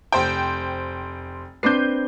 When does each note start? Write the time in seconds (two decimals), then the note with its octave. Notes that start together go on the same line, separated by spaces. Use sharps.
0.12 F1 C5 G5
1.63 C4 D4 B4 G6 C7